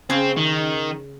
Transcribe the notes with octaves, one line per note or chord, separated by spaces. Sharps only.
C#3 C4 C#4
D#3